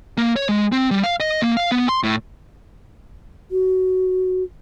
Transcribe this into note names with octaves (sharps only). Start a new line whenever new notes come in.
A#3
C#5
G#3
C4
G3
F5
D#5
A#3
F5
B3
C6
A2
F#4